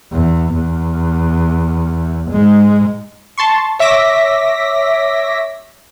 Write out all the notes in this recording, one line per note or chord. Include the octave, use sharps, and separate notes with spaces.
E2
E2
G#2 G#3
A5 C6 C#6
C#5 E5 D6 A#6 B6